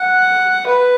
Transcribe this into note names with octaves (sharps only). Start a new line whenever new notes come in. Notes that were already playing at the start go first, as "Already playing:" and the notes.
Already playing: F#5
B4